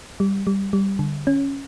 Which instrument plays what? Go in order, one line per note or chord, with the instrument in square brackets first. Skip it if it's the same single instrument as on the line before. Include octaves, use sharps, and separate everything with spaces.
[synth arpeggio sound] G3
G3
G3
D3
C#4